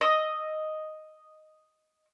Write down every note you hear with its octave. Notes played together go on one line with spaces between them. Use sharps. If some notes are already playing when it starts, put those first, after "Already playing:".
D#5 E6